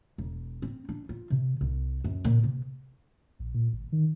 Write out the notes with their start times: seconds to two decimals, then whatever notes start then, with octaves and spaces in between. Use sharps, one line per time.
0.18 E1
0.62 C4
0.89 D4
1.09 F4
1.30 C3
1.61 C2
2.04 F#2
2.24 A#2
2.43 C3
3.40 A#1
3.55 A#2
3.73 G#1
3.92 D#3